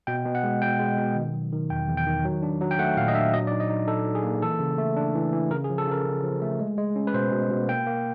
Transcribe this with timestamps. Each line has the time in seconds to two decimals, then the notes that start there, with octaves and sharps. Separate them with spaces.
0.07 B2 G5
0.25 B2
0.35 F#5
0.43 G#3
0.62 B2 G5
0.79 G#3
0.98 B2
1.16 D#3
1.34 F#3
1.52 D#3
1.70 E2 G5
1.88 E2
1.97 G5
2.06 D#3
2.25 F#3
2.42 D4
2.61 F#3
2.71 G5
2.79 A3 F#5
2.97 A#2 F5
3.08 D#5
3.15 D4 E5
3.33 F#3 D#5
3.47 D5
3.52 D#4
3.60 D#5
3.70 D#4
3.88 D#4 A4
4.06 F#3
4.15 G#4
4.24 A#3
4.42 E3 A4
4.60 C#3
4.78 A3
4.96 D4
5.15 E3
5.33 E3
5.51 C#3 A#4
5.64 G#4
5.69 F3
5.78 A4
5.87 C#3 A#4
6.06 C#3
6.23 F3
6.42 A3
6.60 G#3
6.78 G#3
6.96 C#4
7.07 B4
7.14 B2 C5
7.32 B2
7.51 B2
7.68 A#3 G5
7.86 A#3